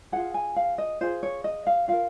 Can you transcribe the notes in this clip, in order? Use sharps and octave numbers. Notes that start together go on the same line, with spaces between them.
F4 G#4 F#5
G#5
F5
D#5
F4 G#4 C5
C#5
D#5
F5
F4 A#4 F5